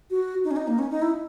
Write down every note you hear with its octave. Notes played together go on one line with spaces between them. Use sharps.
F#4
D#4
C#4
D#4
A#3
C#4
D#4
E4